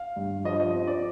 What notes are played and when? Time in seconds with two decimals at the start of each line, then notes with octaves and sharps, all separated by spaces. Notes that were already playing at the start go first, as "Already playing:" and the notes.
Already playing: F5
0.16 G2
0.45 F3 D#5
0.60 D#5
0.74 C4
0.87 D5